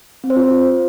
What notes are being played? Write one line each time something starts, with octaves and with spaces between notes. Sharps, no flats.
C4
C5
F4